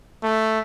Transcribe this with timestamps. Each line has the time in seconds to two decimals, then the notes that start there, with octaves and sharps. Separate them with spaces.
0.23 A3